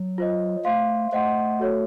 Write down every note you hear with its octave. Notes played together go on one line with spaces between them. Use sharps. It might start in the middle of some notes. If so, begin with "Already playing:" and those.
Already playing: F#3
F4 C5 D#5
A3 C5 F5 C6
A3 C5 D#5 F#5 C6
F#4 A4 C#5